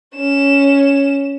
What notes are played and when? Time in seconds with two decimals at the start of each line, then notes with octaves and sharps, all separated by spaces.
0.15 C#4 E7